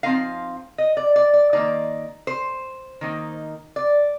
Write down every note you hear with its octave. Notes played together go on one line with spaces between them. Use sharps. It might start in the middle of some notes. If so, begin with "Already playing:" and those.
F3 C4 D#4 F5
D#5
D5
D5
D5
D#3 A#3 D#4 D5
C5
D#3 A#3 D#4
D5